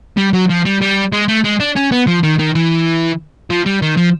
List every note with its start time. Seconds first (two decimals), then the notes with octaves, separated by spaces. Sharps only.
0.17 G3
0.33 F#3
0.49 F3
0.65 G3
0.81 G3
1.12 G#3
1.28 A3
1.44 G#3
1.60 D4
1.76 C#4
1.91 B3
2.07 F3
2.23 D#3
2.39 D#3
2.55 E3
3.50 F3
3.66 G3
3.82 D#3
3.97 F3